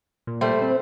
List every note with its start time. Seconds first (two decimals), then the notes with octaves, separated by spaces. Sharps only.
0.27 A#2
0.41 G3 A3 C5
0.62 C4